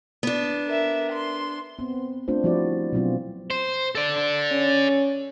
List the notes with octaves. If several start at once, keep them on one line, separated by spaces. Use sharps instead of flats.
B3 D4
A#4 E5
C6
B3 C4
A3 C4 D4 F4 C5
F3 G3 E4 F#4 C5 D5
B2 F#3 B3 C4 D4 F4
C5
A4 D5
C#4